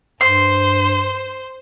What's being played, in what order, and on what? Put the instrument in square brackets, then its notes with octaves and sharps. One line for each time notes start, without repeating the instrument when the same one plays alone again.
[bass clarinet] G2 [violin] C5 [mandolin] C6